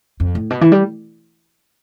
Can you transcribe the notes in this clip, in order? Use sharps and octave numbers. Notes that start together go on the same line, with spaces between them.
F2
A2
B2
E3
G3